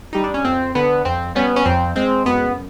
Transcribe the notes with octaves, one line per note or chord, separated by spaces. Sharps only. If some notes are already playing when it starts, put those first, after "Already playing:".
G3 D#4
D4
C#4
F2 C4
D3 B3
F2 C4
G3 B3 C#4
C#4
F2 C4
G#3 C4
F#2 B3